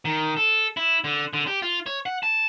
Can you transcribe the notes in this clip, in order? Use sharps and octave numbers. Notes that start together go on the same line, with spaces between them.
D#3
A4
E4
D3
D3
G4
F4
C#5
F#5
A5